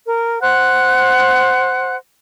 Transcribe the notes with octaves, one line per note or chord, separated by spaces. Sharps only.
A#4
C5 F#5 F#6